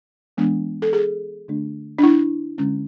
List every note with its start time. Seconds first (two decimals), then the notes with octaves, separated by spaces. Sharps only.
0.37 E3 G#3 B3 D4
0.82 A4
0.93 G#4
1.48 D3 A3 D4
1.99 D4
2.03 E4
2.58 D3 G#3 C#4